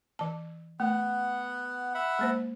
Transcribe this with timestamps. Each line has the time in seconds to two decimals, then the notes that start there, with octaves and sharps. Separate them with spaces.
0.19 E3 A5
0.80 A3 B3 F#5
1.95 E5 F#5 B5
2.19 G#3 A#3 C5